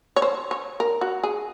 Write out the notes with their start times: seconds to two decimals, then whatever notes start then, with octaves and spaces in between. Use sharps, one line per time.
0.16 C#5
0.22 C5
0.51 C#5
0.80 A#4
1.01 F#4
1.23 G#4